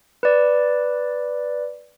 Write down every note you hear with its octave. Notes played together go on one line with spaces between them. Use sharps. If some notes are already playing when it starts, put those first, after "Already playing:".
B4 D5